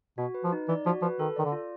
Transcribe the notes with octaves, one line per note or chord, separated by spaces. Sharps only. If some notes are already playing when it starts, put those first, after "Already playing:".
B2 F#4
B4
F3
D#4
E3 D5
F3 F#4
F3 B4
D#3 A4
D#3 D5
D3
F4